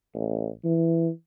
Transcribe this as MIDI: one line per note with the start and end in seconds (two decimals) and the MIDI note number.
0.15 0.49 33
0.65 1.10 52